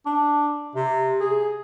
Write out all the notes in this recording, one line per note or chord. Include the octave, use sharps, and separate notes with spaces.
D4
C3
G#4